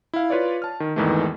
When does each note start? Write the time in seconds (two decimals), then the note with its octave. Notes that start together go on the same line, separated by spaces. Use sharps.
0.13 E4 F5
0.30 F4 B4 C#5 D5
0.62 A5 F6
0.80 D#3
0.96 G#1 E2 D#3 E3 G#3 A3